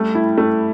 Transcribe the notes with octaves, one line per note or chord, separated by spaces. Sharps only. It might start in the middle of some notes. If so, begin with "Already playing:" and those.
Already playing: G3 A3
E4
A3